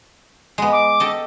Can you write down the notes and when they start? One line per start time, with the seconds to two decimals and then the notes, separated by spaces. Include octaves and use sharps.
0.58 G#3 B3
0.72 D6
1.00 G4 A4 D#5